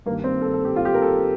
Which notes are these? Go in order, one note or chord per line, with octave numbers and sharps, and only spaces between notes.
G2 D#3 A#3
C4
A4
A4
G4
F4
G4
A#4
A4